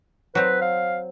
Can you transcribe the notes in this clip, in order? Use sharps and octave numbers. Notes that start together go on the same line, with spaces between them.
F#3 C4 B4
F5